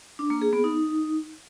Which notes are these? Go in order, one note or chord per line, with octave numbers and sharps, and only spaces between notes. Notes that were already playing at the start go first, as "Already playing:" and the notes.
D4
A#3
G#4
B3
D#4